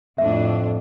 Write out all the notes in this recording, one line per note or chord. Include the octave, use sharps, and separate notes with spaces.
F2 A2 D4 E5